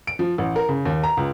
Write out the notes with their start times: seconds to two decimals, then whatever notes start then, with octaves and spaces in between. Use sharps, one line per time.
0.07 D7
0.19 F3
0.38 A1
0.56 A#4
0.69 C#3
0.85 D#2
1.04 A#5
1.17 C#2